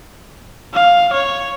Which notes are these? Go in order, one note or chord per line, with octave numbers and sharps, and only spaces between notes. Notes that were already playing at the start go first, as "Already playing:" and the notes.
F5
C#5